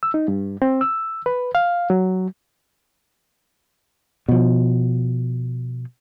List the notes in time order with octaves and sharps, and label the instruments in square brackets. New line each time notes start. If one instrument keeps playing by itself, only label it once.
[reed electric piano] E6
D#4
G2
C4
E6
B4
F5
F#3
[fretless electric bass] B2 F3